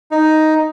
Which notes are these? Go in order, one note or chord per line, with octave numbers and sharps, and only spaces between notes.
D#4